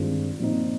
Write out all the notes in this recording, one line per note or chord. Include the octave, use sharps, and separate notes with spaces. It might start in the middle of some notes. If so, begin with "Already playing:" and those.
Already playing: G2 D#3 G#3 C4 F4
A#2 F3 C4 D#4